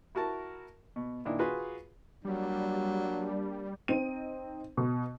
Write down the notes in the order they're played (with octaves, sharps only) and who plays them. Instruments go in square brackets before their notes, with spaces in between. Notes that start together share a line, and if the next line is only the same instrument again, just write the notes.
[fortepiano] E4 F#4 A#4 A5
B2
A#2 D#3 D4 E4
F4 F#4 G#4 B4
[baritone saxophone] F#3 [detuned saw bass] G3 [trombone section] A#3 D4
[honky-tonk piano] C4 D#4 D#7
B2